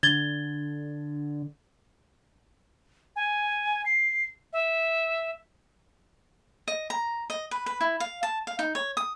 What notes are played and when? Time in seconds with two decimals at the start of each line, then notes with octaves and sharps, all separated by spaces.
0.03 D3 G#6 A6 G7
3.16 G#5
3.86 C7
4.53 E5
6.68 D#5
6.90 A#5
7.30 D#5
7.51 B4
7.66 B4
7.81 E4
8.00 F5
8.23 A5
8.47 F5
8.59 D#4
8.75 C#5
8.97 D#6